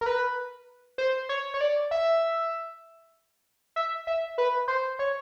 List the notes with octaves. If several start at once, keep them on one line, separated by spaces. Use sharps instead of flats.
A#4
B4
C5
C#5
C#5
D5
E5
E5
E5
B4
C5
C#5